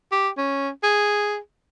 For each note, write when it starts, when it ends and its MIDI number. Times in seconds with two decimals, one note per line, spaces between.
0.12 0.29 67
0.37 0.69 61
0.83 1.37 68